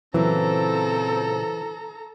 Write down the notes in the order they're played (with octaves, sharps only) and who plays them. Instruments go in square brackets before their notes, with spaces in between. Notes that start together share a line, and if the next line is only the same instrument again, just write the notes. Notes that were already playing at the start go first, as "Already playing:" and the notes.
[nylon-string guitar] A#2 C#3 F#3 [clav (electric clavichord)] E3 [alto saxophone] C4 [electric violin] A4 A#5